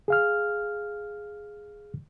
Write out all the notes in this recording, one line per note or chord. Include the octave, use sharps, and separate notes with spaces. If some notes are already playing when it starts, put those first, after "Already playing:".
G#4 F5 F6